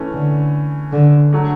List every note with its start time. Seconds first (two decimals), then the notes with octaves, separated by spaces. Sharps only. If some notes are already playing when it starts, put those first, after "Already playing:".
Already playing: E3 A3 C#4
0.13 D3
0.92 D3
1.33 D3 F#3 A3